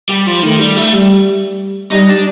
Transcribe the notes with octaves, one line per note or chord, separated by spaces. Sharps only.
G3
F3
D#3 A3
G3
A3
G3
G3 D#4
D4